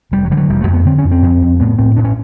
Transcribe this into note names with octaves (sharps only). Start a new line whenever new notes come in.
F1 G3
F#3
D3 G3
F#3
F1 G3
A3
F2
B3
D3 C4
C#4
F2
C4
F2
F2
A2 B3
A2 C4
A2 D4
C#4